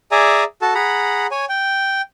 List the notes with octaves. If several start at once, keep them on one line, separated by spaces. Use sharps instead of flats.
G#4 D5 E5 G#5 A#5
F#4 A4 A5
G#4 F#5 A#5 B5
C#5 G#5
G5